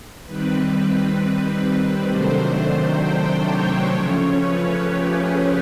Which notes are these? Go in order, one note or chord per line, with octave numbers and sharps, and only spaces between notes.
D#3 G3 C4 B4
C3 D#3 F#3 A3 D4 C5
G5
C#5
C#3 F3 A3 C#4 C#5
B4
G4
G#4